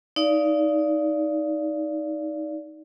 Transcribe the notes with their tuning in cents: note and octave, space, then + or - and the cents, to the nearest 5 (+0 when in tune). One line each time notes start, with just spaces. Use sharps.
D#4 +10 D5 -15 F5 -20